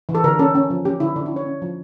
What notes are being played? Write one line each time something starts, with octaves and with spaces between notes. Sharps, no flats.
E3
A4
D3 A#4
C#4 A4
C#4
F3
C#4 G4
D3 E4
D3 D4
E4
C#4
C#5
C#4
F3